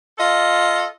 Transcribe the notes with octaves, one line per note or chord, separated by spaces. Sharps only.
F4 A4 D#5